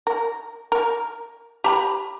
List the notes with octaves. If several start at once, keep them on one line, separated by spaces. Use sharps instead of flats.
A#4
A#4
G4 A#5 B5